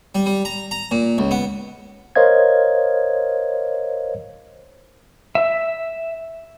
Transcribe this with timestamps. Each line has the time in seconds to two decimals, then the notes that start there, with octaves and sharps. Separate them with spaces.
0.15 G3
0.26 G3
0.45 A#5
0.71 A#5
0.91 A#2
1.18 C#2
1.31 B3
2.16 A#4 C5 C#5 D#5 F5 G#6
5.35 E5